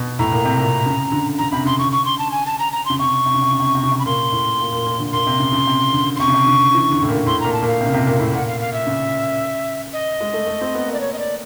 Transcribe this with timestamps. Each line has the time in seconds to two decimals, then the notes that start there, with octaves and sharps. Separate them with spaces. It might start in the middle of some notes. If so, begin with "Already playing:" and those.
Already playing: B2
0.19 A2 A#5
0.32 A#2
0.45 C3
0.59 A#2
0.86 C#3
1.12 D3
1.38 D3 A#5
1.52 C3 B5
1.65 C#3 C6
1.79 D3 C#6
1.92 C#6
2.05 C6
2.19 A5
2.32 G#5
2.46 A5
2.59 A#5
2.72 A#5
2.86 C#3 C6
2.99 C3 C#6
3.26 C3
3.34 C#3
3.42 C3
3.51 C#3
3.59 C3
3.67 C#3
3.75 C3
3.83 C#3
3.92 C3
3.99 B5
4.06 A#2 C6
4.32 A2
4.59 A#2
4.72 A#2
4.86 A#2
5.00 D3
5.13 A#2 C6
5.27 C3
5.40 C#3
5.53 C#3
5.67 C3
5.93 D3
6.16 C6
6.19 C3 C#6
6.28 C#3
6.34 C3
6.47 D3
6.74 E3
6.92 D3
7.02 A2
7.09 A#2
7.26 A2 C6
7.40 A#2 A#5
7.53 A5
7.62 A#2 F5
7.80 C3
7.87 C#3
7.94 C3
8.07 A#2
8.20 A2
8.33 A#2 F#5
8.47 F5
8.61 F5
8.73 E5
8.87 C#3
9.93 D#5
10.21 G#3
10.33 A3
10.47 A3
10.61 C4
10.75 B3
10.87 A#3
10.93 D5
11.00 C#5
11.13 D#5
11.19 D5